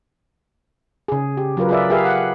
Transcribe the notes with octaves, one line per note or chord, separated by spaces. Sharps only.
C#3 G#4
G4
F#3 F4 A#4 B4
F4 G#4 A#4 B4 D5 E5
G4 G#4 A#4 B4 E5 F5
F#5